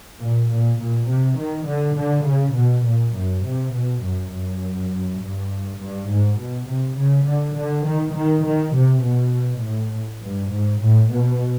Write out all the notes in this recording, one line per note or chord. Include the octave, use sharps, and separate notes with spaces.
A#2
A#2
A#2
C3
D#3
D3
D3
C#3
B2
A#2
F#2
C3
B2
F#2
F#2
G2
G2
G#2
B2
C3
C#3
D3
D3
D#3
D#3
D#3
C3
B2
A2
G2
G#2
A2
B2